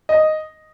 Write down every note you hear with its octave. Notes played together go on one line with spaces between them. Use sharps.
D#5